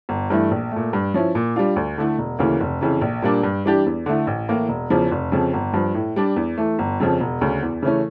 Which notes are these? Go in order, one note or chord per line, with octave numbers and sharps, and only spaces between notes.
G1
G2 E3 A3
A#1
A#2 A3
G2
F3 C#4 E4
A#2
G3 D4 F4
D2
D3 A3 E4
E1
D2 C#3 E3 A#3
F1
F2 C#3 E3
A#1
A#2 G3 A#3 D4
G2
E3 G3 D4 G4
E2
D3 A3 E4
A1
A2 E3 A#3
E1
E2 C#3 F3
F1
F2 C#3 F3
G1
G2 F3
A2
G3 D4
E2
E3 A3
G1
F2 C#3 F3
E1
D2 C#3
E2
C#3 E3 A3 C#4